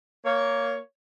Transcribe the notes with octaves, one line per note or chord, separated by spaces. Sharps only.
A#3 C#5